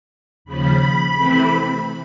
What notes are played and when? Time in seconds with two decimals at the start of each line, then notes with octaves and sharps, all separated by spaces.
0.45 D#2 C#3 F3 B5
1.14 C3 E3 A3 C4